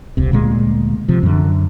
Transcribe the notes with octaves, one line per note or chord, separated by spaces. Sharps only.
D#1 C#2 C3
D2 A#2 G#3
C3 F3
F#2 D3